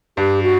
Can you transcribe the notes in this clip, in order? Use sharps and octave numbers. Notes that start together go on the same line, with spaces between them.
G2 G4
F#4